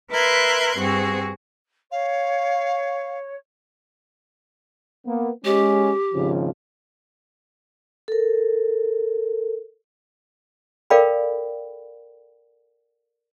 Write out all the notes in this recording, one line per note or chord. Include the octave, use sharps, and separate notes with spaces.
A#4 B4 E5 C6 F#6 G#6
G2 C4 F#4 G#4
C#5 F5
A#3 B3
G#3 C#4 G4
G#1 C#3 F3
A4 A#4
A4 A#4 D5 F5 G5 B5